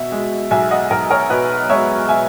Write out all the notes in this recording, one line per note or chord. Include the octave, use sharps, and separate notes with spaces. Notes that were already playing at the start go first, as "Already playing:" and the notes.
Already playing: B2 E5
G#3
B1 E5 G#5
D#5 F#5
B1 A#4
A#4 C#5
B2 B4 D#5
G#3 C#5 E5
E5 G#5